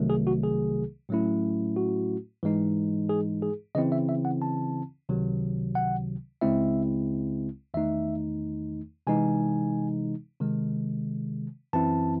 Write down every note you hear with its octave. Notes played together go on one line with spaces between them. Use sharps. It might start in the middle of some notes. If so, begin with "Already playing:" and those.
Already playing: C2 C3 D#3 F#3 A3
G#4
F#4
G#4
A2 F#3 A3 C#4 E4
F#4
G#2 E3 G#3 D#4
G#4
G#4
C#3 E3 C4 E4 D#5
E5
E5
F#5
A5
C#2 C3 D#3 F#3
F#5
C#2 C#3 G#3 C4 E4 E5
E2 D#3 A3 D#4 E5
C3 E3 G#3 D#4 G#5
C3 D#3 G#3
F#2 E3 C4 E4 A5